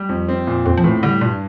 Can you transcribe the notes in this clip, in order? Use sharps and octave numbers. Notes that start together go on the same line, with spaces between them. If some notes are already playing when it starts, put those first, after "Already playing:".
Already playing: G3
F2
C4
A#2
F2 C4
F3
A2 E3
D3 G3
G2 A#2